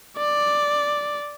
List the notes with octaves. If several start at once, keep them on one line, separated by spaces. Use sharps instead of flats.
D5